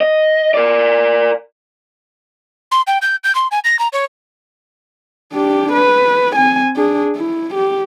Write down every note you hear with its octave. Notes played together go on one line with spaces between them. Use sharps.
D#5
A#4 D5
C6
G5
G6
G6
C6
G#5
A#6
A#5
C#5
D4 G4
B4
C4 G#5
D4 G#4
E4
G4